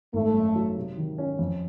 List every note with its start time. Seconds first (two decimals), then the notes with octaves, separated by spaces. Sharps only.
0.14 G#1 A3
0.34 F#2
0.55 F#3
0.76 C3
0.97 D#3
1.18 C#4
1.39 F2